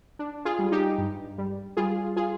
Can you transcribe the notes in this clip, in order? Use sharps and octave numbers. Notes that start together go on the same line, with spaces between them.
D4
F4 G#4
G3
D#4 G4
G2
G3
G3 F4 G#4
F4 G#4